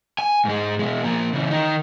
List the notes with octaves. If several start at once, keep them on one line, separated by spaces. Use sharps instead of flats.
G#5
G#2 G#3
B2 G#3
F3 A#3
C#3 E3
D#3 D#4